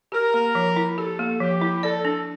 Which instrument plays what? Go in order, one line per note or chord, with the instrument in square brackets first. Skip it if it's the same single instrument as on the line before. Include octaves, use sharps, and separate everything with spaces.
[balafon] G4 [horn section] A#4
[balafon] A#3
F3
E4
[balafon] G4 [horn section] A4
[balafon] A#3
[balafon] F3 [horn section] G4
[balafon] E4
[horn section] A4 [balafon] D5
[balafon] D4